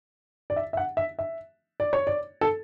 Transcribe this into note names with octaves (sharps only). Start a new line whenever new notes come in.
D5
E5
E5
F#5
E5
E5
D5
C#5
D5
A4